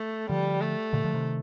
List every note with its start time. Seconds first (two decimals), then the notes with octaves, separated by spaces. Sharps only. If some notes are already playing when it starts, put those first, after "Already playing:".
Already playing: A3
0.29 D3 F3 G3
0.62 A3
0.93 A#2 D3
1.04 D3 F3
1.14 C3 D#3